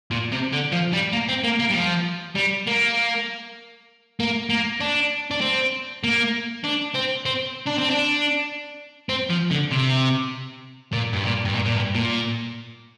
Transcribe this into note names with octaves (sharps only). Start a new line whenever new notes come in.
A#2
C3
D3
F3
G3
A#3
C4
A#3
A#3
G3
F3
G3
A#3
A#3
A#3
D4
D4
C4
A#3
D4
C4
C4
D4
C4
D4
C4
F3
D3
C3
A#2
G2
A#2
G2
A#2
A#2
G2
A#2